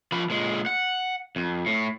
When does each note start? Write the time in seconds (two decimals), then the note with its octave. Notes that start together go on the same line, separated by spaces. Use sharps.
0.12 F3 B5
0.30 A#2 G#3
0.66 F#5
1.36 F2
1.66 A2